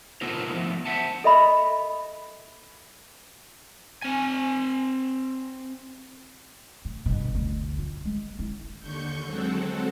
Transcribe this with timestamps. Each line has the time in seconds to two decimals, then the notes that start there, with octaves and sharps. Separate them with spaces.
0.21 B3 D#4 F4 A4 A#4 C5
0.54 F3 A3 B3
0.86 C5 E5 F#5 A5
1.24 A4 D#5 E5 B5
4.02 C4 G#5
6.85 A2
7.06 G1 B2
7.35 D2
7.78 F4
8.05 G#3
8.39 E4
8.80 D#2 D3 C#6 G6
9.25 F#3 G#3 C4 F#4 A4